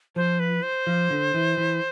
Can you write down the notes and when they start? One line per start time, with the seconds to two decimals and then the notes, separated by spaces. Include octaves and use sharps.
0.16 F3 C5
0.40 B4
0.63 C5
0.87 F3
1.10 D3
1.34 E3
1.58 E3